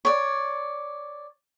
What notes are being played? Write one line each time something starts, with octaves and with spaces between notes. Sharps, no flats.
C#5 D5